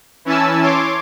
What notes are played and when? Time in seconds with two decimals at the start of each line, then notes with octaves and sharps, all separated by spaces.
0.25 E3 C#4 E4 G#5 A5 E6
0.62 C#5 C6 D6